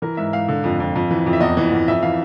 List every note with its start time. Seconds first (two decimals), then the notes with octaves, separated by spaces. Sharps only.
0.02 E3 A#4
0.17 G#2 E5
0.33 G#2 F5
0.48 D3
0.64 F2
0.80 F2
0.95 F2
1.11 E3
1.26 F2
1.33 E5
1.40 E2 D#5
1.57 E3
1.72 E2
1.88 F2 E5
2.03 E3 F5